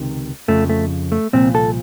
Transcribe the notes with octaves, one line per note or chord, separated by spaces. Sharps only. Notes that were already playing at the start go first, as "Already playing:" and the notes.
Already playing: C#2 C3 D#3
F2 C#3 F3 A3
A3
A3
C2 A#2 F3 C4
A4